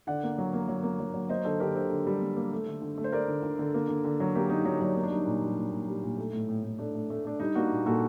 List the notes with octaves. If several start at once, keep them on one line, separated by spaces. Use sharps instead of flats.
D3 D5 F#5
A#3
F#3
A#3
F#3
A#3
F#3
F#3
A#3 C5 D#5
D3 A4 C5
D3 G4 A#4
D3 A4 C5
D3
G3
A#3
A#3
A3
D3
D3
A3
C5
A3 A#4 D5
D3
D3
D3
A#3
D3
D3
F#3
A#3 G4 A#4
A#3 D#4
F#3 D#4
F#3 D4
A#3 D#4
D4
G3 D#4
A#2
G3
A#2
A#2
G3
A#2
A3
A2
A2
A2
A3 D4
A3
A3
A3 D4
G3 D#4
A#3 D4 F#4
A#2
A#2 F#4 A4